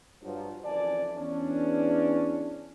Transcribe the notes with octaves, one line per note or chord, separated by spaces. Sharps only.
G2 F3 F#3
F#1 F2 E3 D5 G#5 A5
E2 C#4 D4